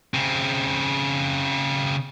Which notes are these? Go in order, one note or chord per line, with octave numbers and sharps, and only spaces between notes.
C#3 C4